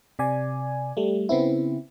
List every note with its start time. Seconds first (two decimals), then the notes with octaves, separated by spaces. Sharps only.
0.19 C3 D5 G#5
0.97 G3 A3
1.29 C#3 B3 C4 E4